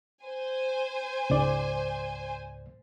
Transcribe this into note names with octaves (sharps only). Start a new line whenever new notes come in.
C5 G#5
C#2 G#2 D5